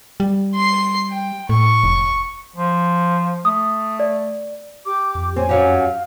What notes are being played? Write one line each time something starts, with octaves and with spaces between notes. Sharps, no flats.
G3
C6 C7
G5
A2 C#6
F1
F3
A3 D#6
D5
G4 D6
F2
C4 C#5 G#5
F#2 F#3 G4 F5